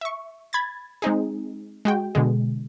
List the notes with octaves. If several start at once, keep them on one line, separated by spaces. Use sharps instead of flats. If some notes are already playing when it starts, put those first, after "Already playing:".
E5 C#6
B5 G#6 A6
G#3 C4 D#4 G#4
G#3 F#4 G5
B2 D3 G#3